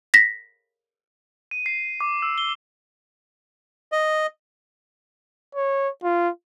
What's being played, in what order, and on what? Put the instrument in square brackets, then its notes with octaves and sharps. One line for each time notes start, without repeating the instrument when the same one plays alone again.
[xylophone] A#6 B6
[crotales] D#7
C7
D6
E6
G7
[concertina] D#5
[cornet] C#5
F4